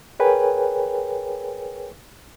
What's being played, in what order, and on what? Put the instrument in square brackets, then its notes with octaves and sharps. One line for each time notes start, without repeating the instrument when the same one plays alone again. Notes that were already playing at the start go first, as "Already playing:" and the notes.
[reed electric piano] G#4 A#4 B4 C#5 G5 G#5